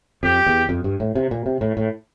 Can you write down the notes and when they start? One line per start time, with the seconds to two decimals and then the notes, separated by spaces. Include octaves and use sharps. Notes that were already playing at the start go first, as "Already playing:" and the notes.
0.23 F2 G4
0.46 E2
0.69 F2
0.84 G2
1.00 A2
1.15 C3
1.31 A#2
1.46 C3
1.61 A2
1.77 A2